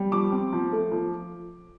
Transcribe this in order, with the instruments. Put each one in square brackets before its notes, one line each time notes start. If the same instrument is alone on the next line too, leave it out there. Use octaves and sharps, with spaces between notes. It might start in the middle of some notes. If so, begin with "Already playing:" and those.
Already playing: [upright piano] G3
F3 D6
C4
F3
A3
F3